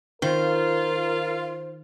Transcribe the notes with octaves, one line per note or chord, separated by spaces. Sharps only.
D#3 F4 A#4 C5